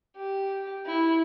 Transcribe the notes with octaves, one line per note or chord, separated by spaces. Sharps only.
G4
E4